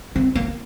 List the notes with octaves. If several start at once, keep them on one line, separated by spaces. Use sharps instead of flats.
C4
A#3